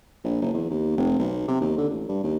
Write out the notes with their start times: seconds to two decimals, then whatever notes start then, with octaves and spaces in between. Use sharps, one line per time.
0.24 A#1
0.41 F#1
0.53 E2
0.70 D#2
0.97 F1
1.19 B1
1.48 C3
1.60 D#2
1.77 D3
1.90 A1
2.09 G2
2.23 D#2